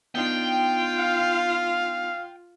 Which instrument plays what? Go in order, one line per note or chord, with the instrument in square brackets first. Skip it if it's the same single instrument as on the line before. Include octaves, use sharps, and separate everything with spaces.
[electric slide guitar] B3 D4 D#4 [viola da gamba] F4 [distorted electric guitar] G5
[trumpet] F5